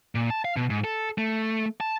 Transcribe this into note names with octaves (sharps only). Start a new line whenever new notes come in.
A#2
A5
F5
B2
G#2
A4
A3
A5